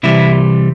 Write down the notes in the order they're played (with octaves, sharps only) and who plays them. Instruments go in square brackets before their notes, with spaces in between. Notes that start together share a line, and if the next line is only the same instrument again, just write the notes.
[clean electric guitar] C3 E3 G3 E4